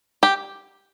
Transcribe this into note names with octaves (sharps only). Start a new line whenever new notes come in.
G4